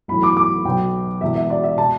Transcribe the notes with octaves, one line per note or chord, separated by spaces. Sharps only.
B1 A2 E3 B5
D6
D6
B1 B2 G5
E1 E2 B2 E5
E5
D5
E5
B2 A5